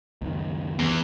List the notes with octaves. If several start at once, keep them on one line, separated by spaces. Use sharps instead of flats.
C#2 F#2 D#3
E2